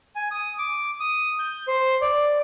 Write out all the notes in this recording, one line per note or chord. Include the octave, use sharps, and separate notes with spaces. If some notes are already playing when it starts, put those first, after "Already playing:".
G#5
D#6
D6
D#6
G6
C5
D5